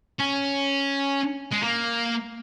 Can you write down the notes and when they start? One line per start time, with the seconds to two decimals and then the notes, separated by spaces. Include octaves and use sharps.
0.20 C#4
1.51 G#3
1.63 A#3